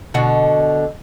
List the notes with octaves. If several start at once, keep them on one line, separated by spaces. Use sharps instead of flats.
B2 D3 F#4